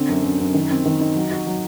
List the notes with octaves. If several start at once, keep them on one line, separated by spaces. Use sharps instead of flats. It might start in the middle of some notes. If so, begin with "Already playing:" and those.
Already playing: D3 C4
F#2
F#2
F#2
D#3
C4
D#3
D#4
F#3
F#4
F#3